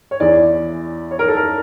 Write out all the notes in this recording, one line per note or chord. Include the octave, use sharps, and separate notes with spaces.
C#5
E2 E3 D5
C#5
A#4
A4
A#4